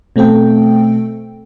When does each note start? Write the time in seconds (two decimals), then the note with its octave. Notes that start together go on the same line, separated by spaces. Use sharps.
0.16 B2 A3 C4 A4 G5